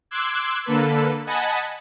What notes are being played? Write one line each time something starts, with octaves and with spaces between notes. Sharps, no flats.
C6 D6 E6 F#6 G#6
D3 A#3 A4 B4
D#5 F#5 G#5 A5 B5